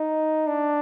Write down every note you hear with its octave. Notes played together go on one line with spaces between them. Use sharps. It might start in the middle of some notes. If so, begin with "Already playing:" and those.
Already playing: D#4
D4